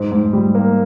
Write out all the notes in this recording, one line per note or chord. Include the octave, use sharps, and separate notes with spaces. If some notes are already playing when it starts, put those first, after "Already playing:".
Already playing: G#2
G#2
G3
A#3